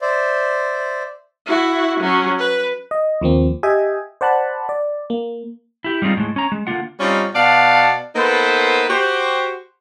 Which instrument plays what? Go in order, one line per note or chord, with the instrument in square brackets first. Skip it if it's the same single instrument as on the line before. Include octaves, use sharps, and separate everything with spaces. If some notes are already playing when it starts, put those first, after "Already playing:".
[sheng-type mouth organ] C5 D5 E5
[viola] E4 F#4
F#3 C#4
B4
[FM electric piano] D#5
D#2 F3 A#3 C4
G4 D#5 E5 G5 G#5
C5 D5 F#5 A5 B5 F#6
D5
A#3
[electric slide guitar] E4 G4
G3 G#3 C4 D#4 F4
A2 G#3
C#4 A#5
G#3
D3 A#3 F4 F#5
[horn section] G3 C4 C#4 D#4 F4
B2 D5 F5 F#5 A5
A#3 B3 D#4 A4 B4 C5
F#4 G4 C5